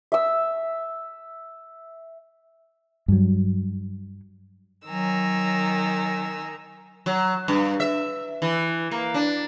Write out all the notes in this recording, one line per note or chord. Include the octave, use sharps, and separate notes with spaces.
E5 E6
G2 F#3
D#3 F#3 G#5 A#5 E6
F#3
G2
E5
E3
A#3
D4